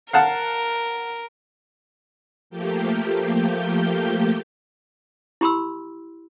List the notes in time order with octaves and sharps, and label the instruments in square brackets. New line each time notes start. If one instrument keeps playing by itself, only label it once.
[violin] A#4 [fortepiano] F5 F#5 A5
[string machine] F3 A3 A#3 G4 G6
[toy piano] E4 G4 B5 C6 E6